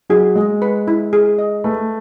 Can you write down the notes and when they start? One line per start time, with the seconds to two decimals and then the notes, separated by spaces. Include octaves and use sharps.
0.09 F#3 G#4
0.35 G#3 D#5
0.62 B4
0.88 E4
1.13 G#4
1.38 D#5
1.64 A3 B4